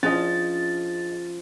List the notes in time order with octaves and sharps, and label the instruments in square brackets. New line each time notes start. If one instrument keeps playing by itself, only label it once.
[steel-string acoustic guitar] F3 [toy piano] C#4 [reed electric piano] D4 G#4 D#5 [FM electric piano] A6